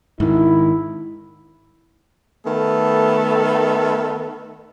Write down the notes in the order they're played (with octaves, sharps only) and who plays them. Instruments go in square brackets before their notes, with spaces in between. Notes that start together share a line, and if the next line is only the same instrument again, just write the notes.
[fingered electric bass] G#2 D#3 [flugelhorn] E4
[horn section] D#3 A3 B3 A4